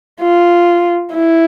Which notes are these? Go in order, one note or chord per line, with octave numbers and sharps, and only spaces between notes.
F4
E4